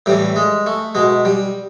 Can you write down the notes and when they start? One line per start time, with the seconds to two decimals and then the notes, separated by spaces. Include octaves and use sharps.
0.06 A2 E3 G3
0.36 G#3
0.67 A3
0.95 B2 G#3
1.25 G3